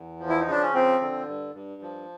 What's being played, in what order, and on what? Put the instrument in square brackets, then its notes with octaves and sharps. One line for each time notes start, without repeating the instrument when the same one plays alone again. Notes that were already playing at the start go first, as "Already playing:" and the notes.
Already playing: [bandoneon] E2
F3
E4
D#4
C#3 D4
C#4
F3 C4
D3
G2
G2
F3